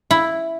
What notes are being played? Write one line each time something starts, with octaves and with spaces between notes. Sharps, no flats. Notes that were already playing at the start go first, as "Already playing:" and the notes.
E4